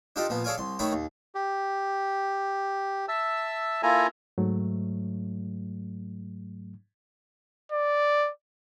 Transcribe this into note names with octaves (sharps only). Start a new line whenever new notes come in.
D4 D#4 F4 G4 A4 D#5
A#2 F3 B3
G#4 A4 C#5 D5 F5 G#5
C2 C6
D#3 A3 C#5 D#5 A#5 B5
D#2
G4
E5 A5 E6
A#3 E4 F4 A4 G#5 A#5
G#2 F#3 A3
D5